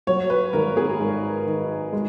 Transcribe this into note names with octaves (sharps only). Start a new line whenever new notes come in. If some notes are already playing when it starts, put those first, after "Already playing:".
F#3 C#5
B4
G#1 A#4
G#4
G#2
D#3
G#3